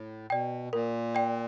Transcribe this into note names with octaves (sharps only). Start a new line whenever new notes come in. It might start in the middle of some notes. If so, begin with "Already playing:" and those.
Already playing: A2
B2 D5 G5
A#2 A#4
D5 G5